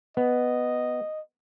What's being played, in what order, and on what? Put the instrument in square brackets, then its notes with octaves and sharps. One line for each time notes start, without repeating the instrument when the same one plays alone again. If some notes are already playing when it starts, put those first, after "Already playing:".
[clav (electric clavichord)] B3 [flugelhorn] D#5